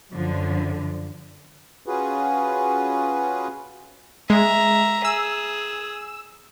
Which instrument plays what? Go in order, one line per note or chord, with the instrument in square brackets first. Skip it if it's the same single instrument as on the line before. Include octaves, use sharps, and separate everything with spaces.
[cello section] F#2 D3 F3
[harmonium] C#4 F4 F#4 G#4 B4
[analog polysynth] G#3 [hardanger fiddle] E5 A#5
[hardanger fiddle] G#4 [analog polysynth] E6